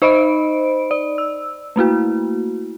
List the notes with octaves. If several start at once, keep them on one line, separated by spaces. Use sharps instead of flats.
D#4 C5 D#5 B5 D7
D5
E6
A3 A#3 E4 F#4